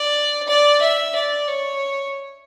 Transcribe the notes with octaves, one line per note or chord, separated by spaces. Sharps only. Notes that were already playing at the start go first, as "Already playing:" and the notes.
Already playing: D5
D5
E5
D5
C#5